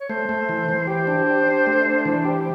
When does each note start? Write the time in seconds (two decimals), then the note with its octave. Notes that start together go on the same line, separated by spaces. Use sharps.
0.01 C#5
0.09 A3 C5
0.29 A3
0.49 E3
0.69 E3
0.87 G4 C5
1.07 D4
1.27 G4
1.47 D4
1.67 A3
1.86 D4
2.05 E3
2.25 G4